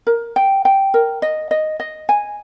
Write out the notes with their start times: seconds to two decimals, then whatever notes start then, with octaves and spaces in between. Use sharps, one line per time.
0.07 A#4
0.36 G5
0.65 G5
0.94 A#4
1.22 D#5
1.51 D#5
1.80 D#5
2.09 G#5